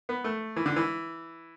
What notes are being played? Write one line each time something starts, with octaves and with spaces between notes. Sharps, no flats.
B3
A3
E3
D3
E3